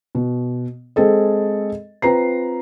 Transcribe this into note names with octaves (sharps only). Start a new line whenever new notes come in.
B2
G#3 C4 G#4 A4 D#5
C4 F4 B4 A#5 C7